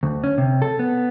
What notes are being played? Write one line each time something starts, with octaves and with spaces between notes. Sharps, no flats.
D2
C#4
C3
A4
B3